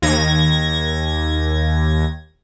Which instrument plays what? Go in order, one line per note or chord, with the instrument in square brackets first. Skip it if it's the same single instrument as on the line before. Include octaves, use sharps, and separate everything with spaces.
[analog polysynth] D#2 G#6 A#6